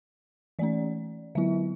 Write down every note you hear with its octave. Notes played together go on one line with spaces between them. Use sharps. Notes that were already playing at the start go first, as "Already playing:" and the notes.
E3 A3 C#4 D5
D3 F#3 B3 E4 E5